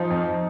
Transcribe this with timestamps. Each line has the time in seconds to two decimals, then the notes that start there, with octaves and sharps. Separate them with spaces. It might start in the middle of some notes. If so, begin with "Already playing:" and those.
Already playing: F3 D#4
0.10 F2